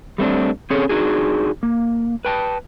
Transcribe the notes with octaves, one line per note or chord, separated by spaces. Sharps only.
G3 A3 C4 D4
C4 C#4 G#4 A4 C#5
D4 D#4 F#4 G#4
A#3
B4 G5 A5